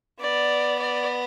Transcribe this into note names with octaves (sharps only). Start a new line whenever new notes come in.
B3 D5
D5